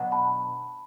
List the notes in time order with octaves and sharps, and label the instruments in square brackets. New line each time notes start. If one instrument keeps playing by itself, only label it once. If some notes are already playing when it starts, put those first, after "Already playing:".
Already playing: [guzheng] B2 F#3 B3 D4 F#4
[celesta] A5 B5